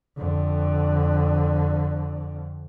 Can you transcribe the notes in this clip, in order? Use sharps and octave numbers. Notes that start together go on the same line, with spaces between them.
F2 D3